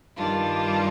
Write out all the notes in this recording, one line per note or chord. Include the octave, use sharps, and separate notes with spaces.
G2 D#3 G3 D4 F4